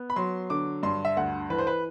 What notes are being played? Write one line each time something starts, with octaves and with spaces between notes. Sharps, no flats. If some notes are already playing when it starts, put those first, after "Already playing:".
Already playing: B3
B5
F#3 C6
D3 D6
G2 C6
E5
D2 F#5
E3 B4
C5
B4